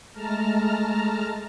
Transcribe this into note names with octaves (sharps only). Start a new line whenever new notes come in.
G#3 A3 A5 A#5 F6